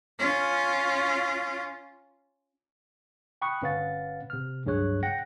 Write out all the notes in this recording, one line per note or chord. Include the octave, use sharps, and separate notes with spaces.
C#4 F4
G5 B5 C#6 D#6 F#6
G1 C#4 B4 F5 F#5 A6
C3 F6
C#2 G2 F#3 G#4 C#5 F#6
F#5 G5 A#6